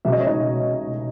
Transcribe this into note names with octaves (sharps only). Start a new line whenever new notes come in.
C#2 B2 F#3 E5
D#5
C#5
D#4 D#5